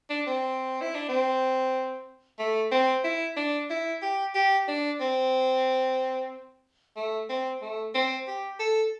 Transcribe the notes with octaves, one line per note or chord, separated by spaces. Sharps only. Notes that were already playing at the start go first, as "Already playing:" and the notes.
D4
C4
E4
D4
C4
A3
C4
E4
D4
E4
G4
G4
D4
C4
A3
C4
A3
C4
G4
A4